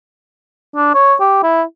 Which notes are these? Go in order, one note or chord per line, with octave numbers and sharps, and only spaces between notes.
D4
C#5
G4
E4